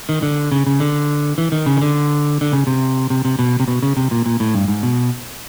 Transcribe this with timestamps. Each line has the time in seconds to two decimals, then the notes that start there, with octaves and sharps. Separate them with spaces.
0.09 D#3
0.22 D3
0.52 C#3
0.67 C#3
0.80 D3
1.38 E3
1.52 D#3
1.66 C#3
1.76 D#3
1.81 D3
2.41 D3
2.53 C#3
2.67 C3
3.10 C3
3.25 C3
3.39 B2
3.60 C3
3.68 B2
3.83 C#3
3.97 C3
4.11 A#2
4.26 A#2
4.40 A2
4.54 G2
4.68 G#2
4.83 B2